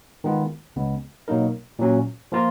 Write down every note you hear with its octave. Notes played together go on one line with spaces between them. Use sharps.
D#3 G#3 B3 F4
C#2 C#3 G#3 B3
B2 F#3 A#3 D#4 A#4
A#2 F#3 C#4
F3 A#3 F4 A#4